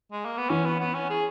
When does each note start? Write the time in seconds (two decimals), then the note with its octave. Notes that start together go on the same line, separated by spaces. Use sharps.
0.12 G#3
0.25 A#3
0.37 B3
0.49 E3 C#4
0.65 B3
0.80 B3
0.94 C#4
1.10 G#4